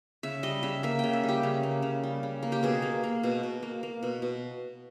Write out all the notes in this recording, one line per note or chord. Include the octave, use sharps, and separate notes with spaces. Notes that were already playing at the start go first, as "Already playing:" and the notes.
C#3 E5
G3 D#5
C#3 E5
A#3 E5
C#3 G5
E5
G3
G4
C#3
A#3
C#3
G3
C#3
A#3
G4
B2 G#4
A#3
A#3
B2
B2
A#3
A#3
B2
B2